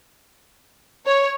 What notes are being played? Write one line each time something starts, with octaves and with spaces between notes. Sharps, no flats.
C#5